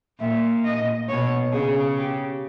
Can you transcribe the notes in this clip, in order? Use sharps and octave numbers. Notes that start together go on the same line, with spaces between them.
A#2 E5
D#5
B2 C#5
C#3 G#4
G4